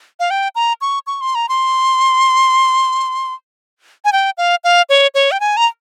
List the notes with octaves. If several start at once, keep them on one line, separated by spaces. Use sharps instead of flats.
F5
G5
A#5
C#6
C#6
C6
A#5
C6
G#5
G5
F5
F5
C#5
C#5
G5
G#5
A#5